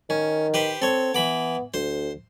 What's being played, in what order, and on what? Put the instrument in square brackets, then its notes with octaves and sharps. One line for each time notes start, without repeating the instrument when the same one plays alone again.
[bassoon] D#3 [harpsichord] C#4
[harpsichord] G4 B4 C5
[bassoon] C4 [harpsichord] A4 C#5
[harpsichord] E3 B5 D6 [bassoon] B3
[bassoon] D2 [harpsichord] C5